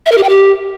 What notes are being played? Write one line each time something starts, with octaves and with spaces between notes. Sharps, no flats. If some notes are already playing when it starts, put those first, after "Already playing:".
E5
A#4
G4
G5
G4